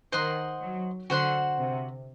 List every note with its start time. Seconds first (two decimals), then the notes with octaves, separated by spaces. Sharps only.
0.12 D#3 C5 D#5 F#5 C6
0.61 F#3
1.10 D3 F#4 C5 F#5 C6
1.59 C3